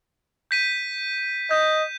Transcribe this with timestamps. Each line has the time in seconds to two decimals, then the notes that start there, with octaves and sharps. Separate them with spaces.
0.51 G6 B6 D#7
1.51 D#5 G6